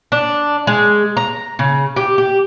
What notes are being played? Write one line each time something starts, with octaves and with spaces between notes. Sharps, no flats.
D4
G#3
A#5
C#3
G4
G4